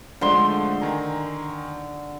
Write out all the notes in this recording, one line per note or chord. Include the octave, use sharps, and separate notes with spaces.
D3 F3 G#3 A3 C6
D#3 G#5 A#5